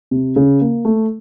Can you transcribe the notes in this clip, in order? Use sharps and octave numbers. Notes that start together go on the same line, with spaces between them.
C3
C#3
A#3
A3